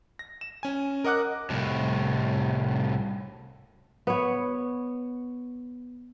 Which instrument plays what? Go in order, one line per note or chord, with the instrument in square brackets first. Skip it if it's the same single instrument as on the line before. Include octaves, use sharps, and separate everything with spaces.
[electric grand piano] A#6
E7
C#4 G#5
A#4 D#5 F#5 D6 F#6
[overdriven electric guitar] C2 A2
[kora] B3 C#5